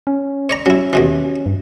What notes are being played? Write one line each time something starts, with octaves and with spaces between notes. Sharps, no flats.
C#4
C#5 D5 A#5
F#3 C#4 E4
D#2 B2 E3
G2